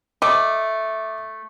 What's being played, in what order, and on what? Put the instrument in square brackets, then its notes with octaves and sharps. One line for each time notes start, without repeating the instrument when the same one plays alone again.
[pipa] A3 D#5 A5 [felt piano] D6